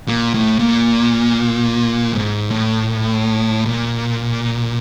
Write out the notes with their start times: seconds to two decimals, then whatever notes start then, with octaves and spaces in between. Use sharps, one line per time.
0.08 A#2
0.34 A2
0.59 A#2
2.13 G#2
2.51 A2
3.66 A#2